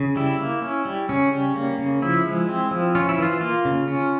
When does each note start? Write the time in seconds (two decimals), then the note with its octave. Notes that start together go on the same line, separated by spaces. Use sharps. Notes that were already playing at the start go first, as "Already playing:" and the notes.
Already playing: C#3
0.16 G3 E4
0.40 A#3
0.62 C#4
0.85 G3
1.09 C#3 C#4
1.33 G3
1.56 A#3
1.78 C#3
2.02 F3 E4
2.25 G#3
2.49 C4
2.71 F3
2.95 C#4 F4
3.09 E4
3.18 E3 F4
3.41 A#3 F4
3.65 C#3
3.88 C#4